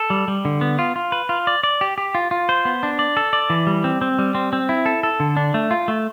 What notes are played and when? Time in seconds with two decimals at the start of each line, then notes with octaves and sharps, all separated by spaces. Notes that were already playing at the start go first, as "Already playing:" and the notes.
Already playing: A4
0.10 G3
0.28 G3
0.45 D3
0.61 B3
0.79 F4
0.96 F4
1.12 B4
1.29 F4
1.47 D5
1.63 D5
1.81 G4
1.98 G4
2.15 F4
2.31 F4
2.49 C5
2.65 B3
2.83 D4
2.99 D5
3.17 A4
3.33 D5
3.50 E3
3.67 G3
3.84 C4
4.01 C4
4.19 G3
4.35 C4
4.53 C4
4.69 E4
4.86 A4
5.03 A4
5.20 D3
5.37 D4
5.54 A3
5.71 F4
5.88 A3